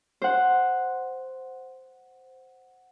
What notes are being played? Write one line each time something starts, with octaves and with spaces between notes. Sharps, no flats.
C5 F#5